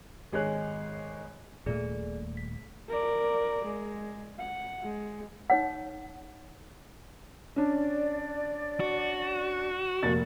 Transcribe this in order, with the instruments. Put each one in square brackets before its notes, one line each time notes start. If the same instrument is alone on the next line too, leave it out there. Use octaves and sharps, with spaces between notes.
[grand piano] G#1 G#3 G#4 C#5 F#6
[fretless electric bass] D#1 A#2 A3 [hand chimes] G#4 D5
[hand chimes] B6
[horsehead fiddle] A#4 D5
G#3
F#5
G#3
[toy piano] D#4 C#5 F#5
[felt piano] C#4 D4 [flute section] D5
[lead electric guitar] F#4
[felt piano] F1 A#3 A6